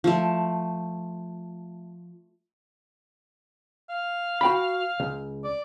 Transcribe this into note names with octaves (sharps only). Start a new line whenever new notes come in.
F3 A3
F5
F#4 G5 B5
C#2
D5